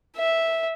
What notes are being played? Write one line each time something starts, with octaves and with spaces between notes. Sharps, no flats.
E5